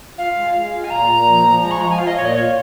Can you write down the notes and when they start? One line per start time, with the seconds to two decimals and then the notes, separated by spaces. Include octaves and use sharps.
0.18 F4 F5
0.36 G#3
0.54 G#3
0.73 F4
0.84 G#5
0.90 A#2 A#5
1.09 A#2
1.27 F3
1.45 F3
1.62 G#3 A#5
1.71 C#6
1.80 F3 A#5
1.90 G#5
1.98 F4 F5
2.07 D#5
2.16 A#2 C#5
2.25 D#5
2.35 F4 C#5